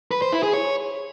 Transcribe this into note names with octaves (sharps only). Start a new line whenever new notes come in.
B4
C5
E4
G#4
C#5